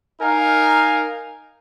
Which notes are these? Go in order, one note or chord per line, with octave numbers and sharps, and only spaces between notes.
D#4 A#4 F5 G#5